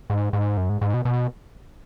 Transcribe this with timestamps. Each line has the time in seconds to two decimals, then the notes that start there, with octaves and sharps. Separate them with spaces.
0.10 G#2
0.33 G#2
0.57 F#2
0.69 G#2
0.81 G#2
0.94 B2
1.05 B2